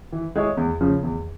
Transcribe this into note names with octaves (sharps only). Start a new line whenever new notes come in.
E3
G#3 E4 G#4 C#5
E2
C#3 F3
E2